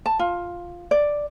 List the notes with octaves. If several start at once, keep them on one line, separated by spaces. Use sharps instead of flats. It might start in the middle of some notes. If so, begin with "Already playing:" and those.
A5
F4
D5